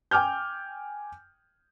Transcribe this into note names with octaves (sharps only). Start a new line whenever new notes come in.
G5 G#5 D6 F6 G6